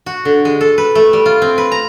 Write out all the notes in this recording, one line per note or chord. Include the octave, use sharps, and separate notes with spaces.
F#4
D3
G#3
A4
B4
A3
G3
F4
C4
B4
A#5